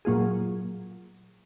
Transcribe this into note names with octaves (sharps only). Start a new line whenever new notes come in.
A#2 F#3 A#3 F4 G#4